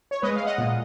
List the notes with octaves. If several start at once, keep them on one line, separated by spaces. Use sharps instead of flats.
C#5
G#3 B4 D#5
F5
D#5 F#5
A#2